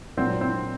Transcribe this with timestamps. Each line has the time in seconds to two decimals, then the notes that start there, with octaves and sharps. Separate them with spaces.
0.17 A#2 F#3 C4
0.41 C4